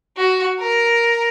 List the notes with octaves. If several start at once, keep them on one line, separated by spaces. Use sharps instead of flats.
F#4
A#4